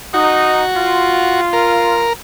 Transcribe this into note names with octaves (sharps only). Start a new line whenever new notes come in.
D#4 F#4
F4
A#4